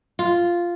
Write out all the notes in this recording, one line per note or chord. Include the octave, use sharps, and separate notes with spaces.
F4